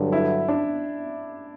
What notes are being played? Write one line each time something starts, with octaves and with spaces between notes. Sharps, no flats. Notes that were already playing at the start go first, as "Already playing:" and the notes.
Already playing: G2 D3 F#3
E4
D4